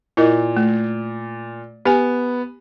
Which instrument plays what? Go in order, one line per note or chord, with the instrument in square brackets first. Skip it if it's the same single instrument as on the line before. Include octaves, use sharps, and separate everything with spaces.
[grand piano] A#2 [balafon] E4 A#4 D#5
[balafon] A3
[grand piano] B3 [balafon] G4 G#5